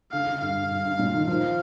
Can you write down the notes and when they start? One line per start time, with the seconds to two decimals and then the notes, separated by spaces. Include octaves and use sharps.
0.12 D3 F5
0.27 D3
0.41 G2 F5
0.56 G2
0.71 G2
0.85 G2
0.99 A#2
1.14 D#3
1.28 F3 F5